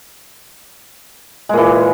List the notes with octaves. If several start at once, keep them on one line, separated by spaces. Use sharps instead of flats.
A#2 E3 G#3